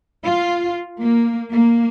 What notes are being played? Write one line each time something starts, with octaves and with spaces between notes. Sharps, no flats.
F4
A#3
A#3